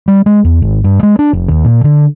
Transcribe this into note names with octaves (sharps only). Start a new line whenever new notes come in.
G3
G#3
E2
G#1
G2
G#3
D4
F1
D#2
A#2
D3